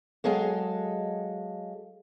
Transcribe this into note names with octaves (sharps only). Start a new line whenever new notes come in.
F#3 G#3 G#4 A4 D#5 F5